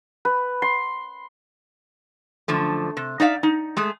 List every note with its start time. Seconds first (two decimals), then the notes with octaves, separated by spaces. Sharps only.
0.25 B4
0.62 C6
2.48 F#2 D3 F3 A3
2.97 C3
3.20 D#4 D5 E5 F5
3.43 D#4
3.77 G#3 A3 G#4